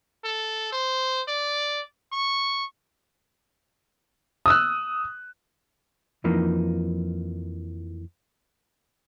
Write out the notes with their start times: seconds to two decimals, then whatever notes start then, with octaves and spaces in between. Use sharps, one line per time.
0.24 A4
0.73 C5
1.28 D5
2.13 C#6
4.46 D#6 E6 F#6
6.24 F2 E3 F3 A#3 D#4